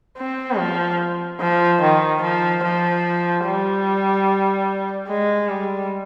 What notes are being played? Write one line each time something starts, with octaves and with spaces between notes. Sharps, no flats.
C4
F3
F3
D#3
F3
F3
G3
G#3
G3